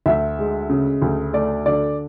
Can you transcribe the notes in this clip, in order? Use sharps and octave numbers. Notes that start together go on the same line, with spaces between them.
D2 E5
G#3
C#3
D2
A3 D5
D3 D5